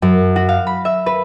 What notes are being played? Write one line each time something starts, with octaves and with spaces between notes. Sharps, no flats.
F#2
F#4
F5
B5
E5
B4